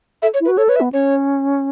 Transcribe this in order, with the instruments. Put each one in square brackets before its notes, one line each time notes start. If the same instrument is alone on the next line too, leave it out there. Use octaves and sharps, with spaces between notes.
[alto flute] A4 [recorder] E5
[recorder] C#5
[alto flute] E4
[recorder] B4
[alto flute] F#4
[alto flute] A4 [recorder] C#5
[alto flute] B4 [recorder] C#5
[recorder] E5
[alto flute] B3
[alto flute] C#4 [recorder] C#5